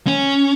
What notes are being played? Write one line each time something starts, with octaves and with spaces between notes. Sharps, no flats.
C#4